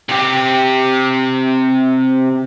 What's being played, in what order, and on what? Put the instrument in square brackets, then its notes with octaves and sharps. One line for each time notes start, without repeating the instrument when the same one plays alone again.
[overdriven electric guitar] C3 G4